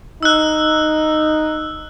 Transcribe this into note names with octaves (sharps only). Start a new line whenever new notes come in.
D#4 E6 F#6